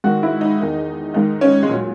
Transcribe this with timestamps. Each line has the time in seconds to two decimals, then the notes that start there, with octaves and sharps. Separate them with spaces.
0.04 G#2 D#3 F#4
0.23 E4
0.41 D#4
0.60 E2 D#3
1.14 G#2 D#3 D#4
1.41 C#4
1.63 G#3
1.69 A#2 F#3